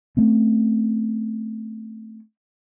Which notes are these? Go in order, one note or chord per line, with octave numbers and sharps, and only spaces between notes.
A3 C4 C#4